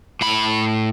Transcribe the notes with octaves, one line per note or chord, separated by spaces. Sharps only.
A2 B5